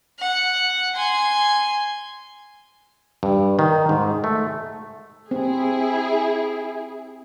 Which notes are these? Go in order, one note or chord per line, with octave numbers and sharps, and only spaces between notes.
F#5
G#5 C6
G2
D#3
G#2
A3
C4 E4 G#4